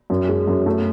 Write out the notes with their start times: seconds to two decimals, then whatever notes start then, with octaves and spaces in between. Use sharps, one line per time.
0.10 F#2
0.29 G#3
0.47 F#2
0.66 A3